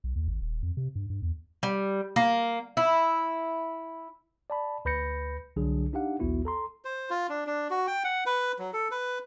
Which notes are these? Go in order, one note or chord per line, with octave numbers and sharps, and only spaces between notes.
B1
D#2
G#1
D#1
F2
C3
G2
G2
E2
G3
A#3
E4
D5 A5 B5
D2 B4 B5 G6 A#6 C#7
C2 D3 F#3 D4 G#4
D4 D#4 G4 F5 F#5
A#1 D#2 B3 E4 F#4
A4 A#5 C6
C5
F4
D4
D4
F#4
G5
F#5
B4
F#3
A4
B4